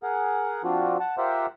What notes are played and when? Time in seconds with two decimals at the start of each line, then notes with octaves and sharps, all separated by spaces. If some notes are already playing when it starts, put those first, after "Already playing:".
0.03 G#4 A#4 F#5
0.64 F3 C4 D4 F4 F#4
1.00 F#5 A5
1.18 F4 G4 A#4 C5 E5 F#5